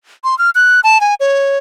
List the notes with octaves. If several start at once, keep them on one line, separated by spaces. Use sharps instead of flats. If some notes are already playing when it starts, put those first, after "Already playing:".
C6
F6
F#6
A5
G#5
C#5